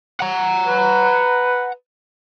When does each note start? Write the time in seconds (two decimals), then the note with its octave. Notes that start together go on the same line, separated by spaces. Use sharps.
0.20 F#5 A#5
0.67 B4